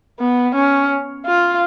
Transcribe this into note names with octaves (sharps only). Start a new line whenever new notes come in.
B3
C#4
F4